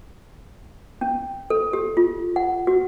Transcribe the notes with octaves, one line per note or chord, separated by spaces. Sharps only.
C#4
A4
G4
F4
F#5
F#4